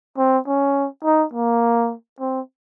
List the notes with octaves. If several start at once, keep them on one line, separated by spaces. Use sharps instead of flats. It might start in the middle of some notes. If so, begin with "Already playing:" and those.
C4
C#4
D#4
A#3
C4